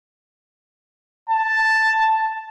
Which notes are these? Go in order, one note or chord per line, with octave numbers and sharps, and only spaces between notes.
A5